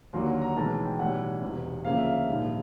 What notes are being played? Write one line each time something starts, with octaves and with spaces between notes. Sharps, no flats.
D#2 D3 F#3 A#3 C6
A#5
A#5
B1 A2 E3 G#3 A5
G5
B1 A2 E3 G3 F#5
E1 E2 C3
D2 C#3 F3 A#3 F5
E5
F5
A#1 G#2 D#3 G3